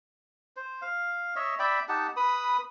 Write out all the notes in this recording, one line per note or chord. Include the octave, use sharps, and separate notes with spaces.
C5
F5
C#5 D#5 E5
D5 E5 G5 B5
D#4 G4 F#5 A5
B4 B5 D#6